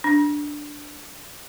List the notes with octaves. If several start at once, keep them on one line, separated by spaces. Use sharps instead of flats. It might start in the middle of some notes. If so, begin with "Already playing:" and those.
D4